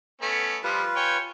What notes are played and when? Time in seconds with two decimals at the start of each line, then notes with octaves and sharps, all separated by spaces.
0.22 A3 B3 C#4
0.64 F3 G3 F4 B4
0.96 C#5 G5 G#5